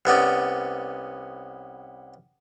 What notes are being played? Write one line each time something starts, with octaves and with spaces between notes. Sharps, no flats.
C2 B3 C#4 D5